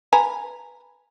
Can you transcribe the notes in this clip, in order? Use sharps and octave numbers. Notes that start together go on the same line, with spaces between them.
B4 G#5 A#5